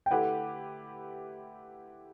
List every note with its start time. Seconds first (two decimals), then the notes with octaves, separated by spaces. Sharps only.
0.06 G5
0.11 D3 A3 E4 G4 B4 F#5